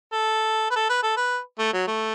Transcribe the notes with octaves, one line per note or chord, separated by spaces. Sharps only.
A4
B4
A4
B4
A4
B4
A3
F#3
A3